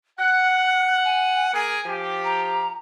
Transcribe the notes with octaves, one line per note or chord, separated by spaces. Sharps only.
F#5 F#6
G#5
A#3 G#4 A#4 G#5
F3 G4
A#5